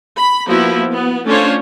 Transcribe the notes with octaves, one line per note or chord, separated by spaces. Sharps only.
B5
F3 A#3 B3 E4 F#4
B3
A3 C#4 D4 F4 C5 C#5